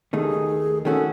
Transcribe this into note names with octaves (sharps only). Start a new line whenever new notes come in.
D#2 D#3 A3 D#4 G#4
D#3 A3 C#4 F#4 A4